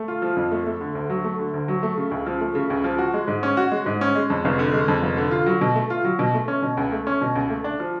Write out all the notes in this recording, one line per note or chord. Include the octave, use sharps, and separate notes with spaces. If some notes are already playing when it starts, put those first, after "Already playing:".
Already playing: A3
F4
F3
F2
A3
A3
D3
D2
F#3
A3
D3
D2
F#3
A3
C#3
C#2
F3
A3
C#3
C#2
F3
F#4
G#3
G#2
C#4
F#4
G#3
G#2
C#4
G#3
F2
F1
D3
G#3
F2
F1
D3
F4
F#3
B2
A3
F4
F#3
B2
A3
C#4
B2
C#2
A3
C#4
B2
C#2
A3
D4
F3